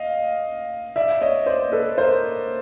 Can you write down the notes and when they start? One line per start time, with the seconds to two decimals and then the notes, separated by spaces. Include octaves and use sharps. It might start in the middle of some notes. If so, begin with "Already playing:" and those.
Already playing: D#5 F5
0.96 D5 E5
1.21 C#5 D#5
1.46 C5 D5
1.72 A4 B4
1.98 A#4 C5